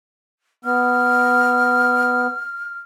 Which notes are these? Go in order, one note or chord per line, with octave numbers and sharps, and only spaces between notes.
B3 F6